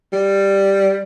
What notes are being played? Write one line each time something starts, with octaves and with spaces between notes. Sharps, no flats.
G3